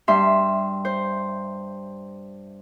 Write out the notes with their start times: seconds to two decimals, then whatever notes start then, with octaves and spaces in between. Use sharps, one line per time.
0.08 G2 E5 C6
0.85 C5